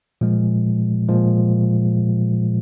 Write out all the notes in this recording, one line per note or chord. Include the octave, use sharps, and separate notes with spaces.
A#2 F3 G#3
A#2 F3 G#3